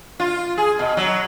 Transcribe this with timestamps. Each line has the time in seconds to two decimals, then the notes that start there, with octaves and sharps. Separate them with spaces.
0.20 F4
0.57 G#4
0.79 B2
0.97 F#3